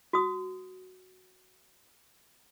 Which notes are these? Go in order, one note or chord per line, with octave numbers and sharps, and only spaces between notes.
F#4 D#6